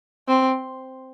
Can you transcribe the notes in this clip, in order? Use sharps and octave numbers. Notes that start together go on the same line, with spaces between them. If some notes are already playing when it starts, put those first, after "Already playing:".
C4